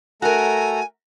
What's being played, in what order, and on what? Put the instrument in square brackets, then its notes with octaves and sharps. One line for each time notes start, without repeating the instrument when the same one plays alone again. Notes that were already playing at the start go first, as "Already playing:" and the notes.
[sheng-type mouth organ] A3 A4 A#5 [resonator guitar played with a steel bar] F#4 A#4 [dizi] G#5